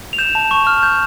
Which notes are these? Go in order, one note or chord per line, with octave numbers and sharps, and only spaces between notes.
F7
G6 E7
A5
C#6
F6
G6